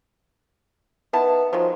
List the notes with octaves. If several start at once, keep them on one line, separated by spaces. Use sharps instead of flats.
D#3 B3 E4 A5
D#3 F3 F#3 G#3